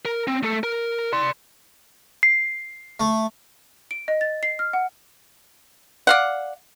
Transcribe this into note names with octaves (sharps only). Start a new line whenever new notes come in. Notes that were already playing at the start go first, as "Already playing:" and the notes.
A#4
C4
A3 A4
A#4
D5 C6
C7
A3
D7
D#5
A6
C7
F6
F#5
D5 F5 F#5